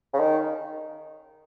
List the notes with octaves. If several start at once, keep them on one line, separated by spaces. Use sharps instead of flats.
C#3
D#3